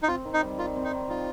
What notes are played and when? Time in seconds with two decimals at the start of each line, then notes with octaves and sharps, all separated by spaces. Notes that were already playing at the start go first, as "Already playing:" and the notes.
0.03 D#4
0.08 C4 F4
0.25 D#3
0.34 D#4
0.42 G3
0.58 D#3 F4
0.76 C4
0.84 D#4
0.93 D#3
1.09 D#4 F4